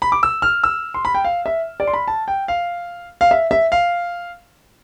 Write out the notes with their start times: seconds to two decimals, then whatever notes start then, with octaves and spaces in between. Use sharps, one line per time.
0.02 B5
0.12 D6
0.23 E6
0.42 F6
0.64 E6
0.94 C6
1.05 B5
1.15 G5
1.24 F5
1.46 E5
1.80 D5
1.87 C6
1.94 B5
2.08 A5
2.28 G5
2.48 F5
3.21 F5
3.31 E5
3.51 E5
3.72 F5